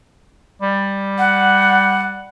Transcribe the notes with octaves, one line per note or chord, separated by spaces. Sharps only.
G3
F#5